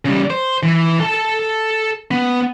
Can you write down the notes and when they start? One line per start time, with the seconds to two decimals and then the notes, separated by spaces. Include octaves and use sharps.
0.05 C#3 G3
0.30 C5
0.63 E3
1.00 A4 A5
2.11 B3